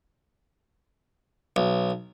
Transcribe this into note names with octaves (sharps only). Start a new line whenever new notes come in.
B1